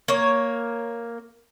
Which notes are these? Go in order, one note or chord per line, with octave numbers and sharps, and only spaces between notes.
A#3 C#5